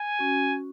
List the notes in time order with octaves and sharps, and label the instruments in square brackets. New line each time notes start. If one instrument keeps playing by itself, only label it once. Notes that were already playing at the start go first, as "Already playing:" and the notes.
Already playing: [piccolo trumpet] G#5
[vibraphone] C#4 F#4